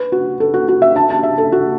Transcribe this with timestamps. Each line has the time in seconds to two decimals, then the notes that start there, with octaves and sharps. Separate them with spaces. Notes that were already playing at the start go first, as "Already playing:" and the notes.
Already playing: B4
0.12 F#4
0.40 A4
0.54 F#4
0.68 F#4
0.82 E5
0.96 A5
1.10 A5
1.23 E5
1.38 A4
1.52 F#4